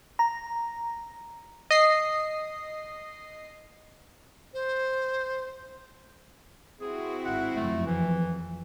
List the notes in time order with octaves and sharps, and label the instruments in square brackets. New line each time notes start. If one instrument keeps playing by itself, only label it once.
[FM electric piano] A#5
[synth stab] D#5 C7
[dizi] C5
[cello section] C4 E4 F#4 [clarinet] G#4
[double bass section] G#1 [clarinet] F#5
[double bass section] F#1 F2 [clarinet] A3
[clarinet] E3